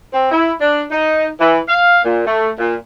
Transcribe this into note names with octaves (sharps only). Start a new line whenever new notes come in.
C4
E4
D4
D#4
E3
F5
A#2
A3
A#2